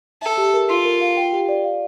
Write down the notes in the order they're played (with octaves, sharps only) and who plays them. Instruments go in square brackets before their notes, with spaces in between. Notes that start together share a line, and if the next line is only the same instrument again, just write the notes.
[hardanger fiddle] A4 [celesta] E5
[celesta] G4
A#4
[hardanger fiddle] F4 [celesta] C6
[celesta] A#4
F5
G5
G4
D5
F5